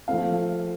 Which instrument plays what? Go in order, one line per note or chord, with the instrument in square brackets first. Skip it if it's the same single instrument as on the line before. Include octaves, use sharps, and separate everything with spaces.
[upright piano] F3 A3 C4 F5